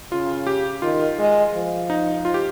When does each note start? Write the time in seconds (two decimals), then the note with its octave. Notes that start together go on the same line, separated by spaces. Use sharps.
0.12 C#3 F4
0.47 G4
0.82 D#3 F4
1.19 G#3
1.54 F3
1.90 D#4
2.25 F4
2.34 G4